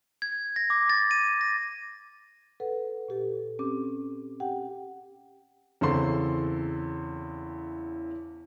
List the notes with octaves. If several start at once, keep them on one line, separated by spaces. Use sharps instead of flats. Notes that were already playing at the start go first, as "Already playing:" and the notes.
G#6
A#6
D6
A6
D#7
A#6
A4 B4 F#5
A#2 G4 A4
C4 C#4 G4 D6
G4 F#5 G5
E2 C#3 E3 C4 A4 C6